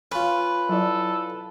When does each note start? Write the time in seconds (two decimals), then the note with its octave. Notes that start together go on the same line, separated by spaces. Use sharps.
0.12 C#4 F4 B4
0.69 F#3 E4 A4 D5